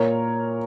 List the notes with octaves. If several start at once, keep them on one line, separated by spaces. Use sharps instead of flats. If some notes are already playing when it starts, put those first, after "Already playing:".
Already playing: A#2 A#4 C#5